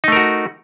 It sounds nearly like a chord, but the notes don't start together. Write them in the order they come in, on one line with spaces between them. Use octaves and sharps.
D#4 A3 A#4 F#4